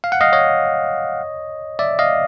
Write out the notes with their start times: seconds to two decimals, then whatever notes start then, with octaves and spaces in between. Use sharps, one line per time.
0.04 F5
0.12 F#5
0.21 D#5 F5
0.33 C#5 D#5
1.79 D5 E5
1.99 D#5 F5